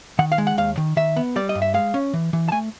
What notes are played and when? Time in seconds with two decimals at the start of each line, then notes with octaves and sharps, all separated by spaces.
0.19 D#3 F#5
0.32 F5
0.38 G#3
0.47 F#5
0.57 D#2 F5
0.77 D#3
0.97 D#3 E5
1.16 B3
1.36 G3 D5
1.49 D#5
1.55 G2
1.62 E5
1.74 G#3 F5
1.94 C#4
2.14 E3
2.33 E3
2.49 A5
2.52 A3 G#5